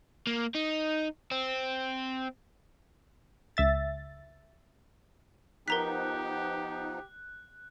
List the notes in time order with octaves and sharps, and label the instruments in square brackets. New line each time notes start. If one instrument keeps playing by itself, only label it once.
[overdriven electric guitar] A#3
D#4
C4
[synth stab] C#2 E5 A6
[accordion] F3 B3 D#4 [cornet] G4 [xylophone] A#4 A#5 B6 [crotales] F#6